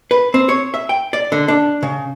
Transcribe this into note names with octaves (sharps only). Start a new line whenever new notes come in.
B4
C4
C#5
E5
G5
D5
D3
D4
C#3